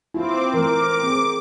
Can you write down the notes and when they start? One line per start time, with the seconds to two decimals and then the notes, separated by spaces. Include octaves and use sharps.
0.14 C4 E4 F4 D6
0.54 E3 A3 A#4 D6
1.04 C4 G#4